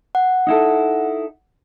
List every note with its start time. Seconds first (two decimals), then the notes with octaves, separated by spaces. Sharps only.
0.15 F#5
0.47 D#4 E4 A4